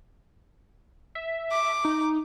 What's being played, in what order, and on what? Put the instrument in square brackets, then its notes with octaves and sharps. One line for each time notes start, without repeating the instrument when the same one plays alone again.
[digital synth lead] E5
[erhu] D6
[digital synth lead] D#4